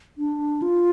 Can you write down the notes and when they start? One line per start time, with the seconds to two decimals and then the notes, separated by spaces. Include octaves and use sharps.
0.18 D4
0.62 F4